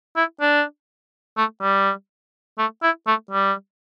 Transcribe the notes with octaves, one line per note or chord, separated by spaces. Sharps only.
E4
D4
A3
G3
A3
E4
A3
G3